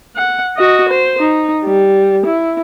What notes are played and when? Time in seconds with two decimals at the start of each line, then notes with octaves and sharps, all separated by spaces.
0.16 F#5
0.56 F#4 D#5
0.89 C5
1.19 D#4
1.64 G3
2.26 E4